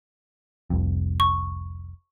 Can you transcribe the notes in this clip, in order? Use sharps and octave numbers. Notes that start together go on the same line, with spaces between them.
F1 C2 F2
C#6